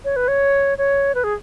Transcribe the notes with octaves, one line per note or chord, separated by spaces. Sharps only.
C#5
B4
C#5
C#5
B4
G#4